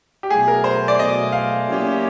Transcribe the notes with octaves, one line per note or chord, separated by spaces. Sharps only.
G4
B2 F#3 A3 G#4
A#4
C5
D5
B2 F#3 A3 D#5
F5
F#3 A#3 C#4 E4 G4